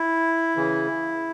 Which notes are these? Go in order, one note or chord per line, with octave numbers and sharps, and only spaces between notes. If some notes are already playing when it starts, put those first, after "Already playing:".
Already playing: E4
C#3 E3